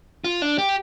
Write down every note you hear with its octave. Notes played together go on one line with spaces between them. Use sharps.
F4
D4
G4